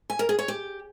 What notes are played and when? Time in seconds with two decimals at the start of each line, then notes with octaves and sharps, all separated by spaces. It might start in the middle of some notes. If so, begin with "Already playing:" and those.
0.10 G#5
0.19 A#4
0.29 G#4
0.39 C#5
0.48 G4